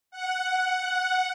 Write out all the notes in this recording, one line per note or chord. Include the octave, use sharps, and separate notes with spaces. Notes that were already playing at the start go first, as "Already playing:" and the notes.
F#5